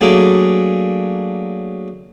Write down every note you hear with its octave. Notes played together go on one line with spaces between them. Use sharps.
F#3 A3 A#3 D4 G#4